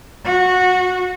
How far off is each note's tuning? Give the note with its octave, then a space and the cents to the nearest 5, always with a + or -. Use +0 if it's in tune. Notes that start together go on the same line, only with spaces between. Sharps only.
F#4 -15